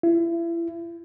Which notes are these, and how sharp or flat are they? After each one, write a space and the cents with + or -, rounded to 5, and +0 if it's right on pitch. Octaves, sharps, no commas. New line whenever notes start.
E4 +35